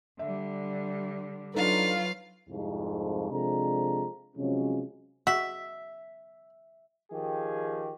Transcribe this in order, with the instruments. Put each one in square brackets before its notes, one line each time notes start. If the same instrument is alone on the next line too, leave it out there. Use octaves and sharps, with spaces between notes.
[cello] D3 G3 [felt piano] E5
[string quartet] F#3 F4 [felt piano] D4 D#4 A4 [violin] B4 F5
[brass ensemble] C2 F2 G#2
C3 F3 G#3 D4 A4 A#5
C3 F3 F#3 G#3 C#4
[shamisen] F#4 [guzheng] E5
[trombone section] D#3 F3 G4 G#4